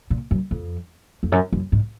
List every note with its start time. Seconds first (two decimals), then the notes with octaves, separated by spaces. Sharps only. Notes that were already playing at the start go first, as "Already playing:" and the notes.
0.10 A#2
0.31 F#2
0.51 F2
1.23 F2
1.32 F#2
1.53 F#2
1.72 G#2